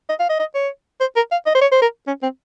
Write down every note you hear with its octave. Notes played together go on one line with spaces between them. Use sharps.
D#5
F5
D#5
D#5
C#5
C5
A#4
F5
D#5
C5
C#5
C5
A#4
C#4
C4